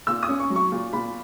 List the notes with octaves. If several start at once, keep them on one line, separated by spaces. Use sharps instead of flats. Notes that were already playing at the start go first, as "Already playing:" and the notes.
A#2 E6
D#6
C#4
C#6
F#3
C#6
A#2
A#2 B5